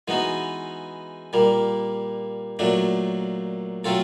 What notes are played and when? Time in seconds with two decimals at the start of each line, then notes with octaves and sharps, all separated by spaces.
0.08 E3 G#3 B3 D#4 F#4
1.33 A#2 G3 A#3
2.59 A#2 F#3 A3 D4
3.84 F#3 A3 C4 F4 A4